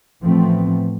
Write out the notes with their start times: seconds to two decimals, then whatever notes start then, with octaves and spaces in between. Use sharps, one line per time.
0.23 A2 E3 F3 A3 B3 C4